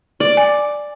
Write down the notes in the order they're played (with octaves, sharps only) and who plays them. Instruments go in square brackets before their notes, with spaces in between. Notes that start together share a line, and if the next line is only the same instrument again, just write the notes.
[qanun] D5 [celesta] D7
[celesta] G#5